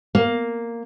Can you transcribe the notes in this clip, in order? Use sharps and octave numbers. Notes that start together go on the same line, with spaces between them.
A#3